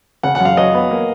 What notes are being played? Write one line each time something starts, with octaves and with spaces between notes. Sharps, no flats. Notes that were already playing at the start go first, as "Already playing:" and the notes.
C#3 F#5
F#5
F#2
F5
F#3 D#5
B3
A#3